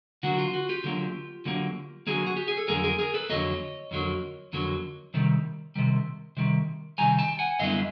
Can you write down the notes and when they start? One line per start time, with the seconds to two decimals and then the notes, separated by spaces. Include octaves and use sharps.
0.23 D3 F#3 A#3 F#4
0.38 F4
0.54 F#4
0.69 F4 G4
0.84 D3 F#3 A#3
1.45 D3 F#3 A#3
2.07 D3 F#3 A#3 F#4 G#4
2.27 F#4
2.37 G4
2.48 G#4
2.57 A4
2.68 F2 D3 F#3 A#3 G#4 A#4
2.84 G#4 A#4
2.99 G#4 A#4
3.14 A4 B4
3.29 F2 D3 F#3 A#3 C#5 D#5
3.91 F2 D3 F#3 A#3
4.53 F2 D3 F#3 A#3
5.14 C3 D#3 G3
5.76 C3 D#3 G3
6.37 C3 D#3 G3
6.98 C3 D#3 G3 G#5 A#5
7.19 G5 A5
7.39 F#5 G#5
7.59 F#2 D3 G3 B3 E4 D#5 F5